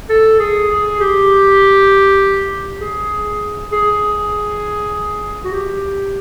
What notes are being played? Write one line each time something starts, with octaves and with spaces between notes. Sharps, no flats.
A4
G#4
G#4
G4
G#4
G#4
F#4
G4